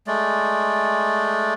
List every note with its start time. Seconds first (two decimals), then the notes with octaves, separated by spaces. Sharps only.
0.07 G#3 A3 D5